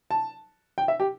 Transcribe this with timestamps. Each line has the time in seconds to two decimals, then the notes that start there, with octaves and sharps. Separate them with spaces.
0.11 A5
0.78 G5
0.88 E5
1.00 G4